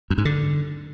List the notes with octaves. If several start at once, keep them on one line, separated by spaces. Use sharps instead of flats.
F#2
G#2
D3